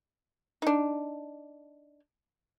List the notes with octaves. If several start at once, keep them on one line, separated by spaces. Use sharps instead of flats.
D4 D#4